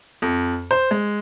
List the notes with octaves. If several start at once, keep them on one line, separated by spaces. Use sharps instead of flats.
F2
C5
G#3